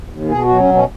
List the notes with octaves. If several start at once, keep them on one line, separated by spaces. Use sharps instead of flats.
D#2
B2 G#4
F#4
F#3
C#4
B2
C#4